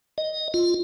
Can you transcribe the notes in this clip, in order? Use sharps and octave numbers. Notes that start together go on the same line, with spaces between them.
D#5
F4